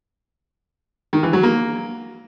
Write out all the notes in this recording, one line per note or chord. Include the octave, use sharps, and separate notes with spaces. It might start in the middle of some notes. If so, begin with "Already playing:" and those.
D#3
E3
F#3
A#3